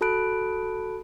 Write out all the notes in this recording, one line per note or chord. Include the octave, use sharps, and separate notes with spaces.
F#4 A4 A5 B5 F#6 D7